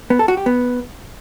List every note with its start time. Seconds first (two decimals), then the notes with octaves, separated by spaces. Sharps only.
0.10 B3
0.19 A4
0.28 F#4
0.37 G4
0.46 B3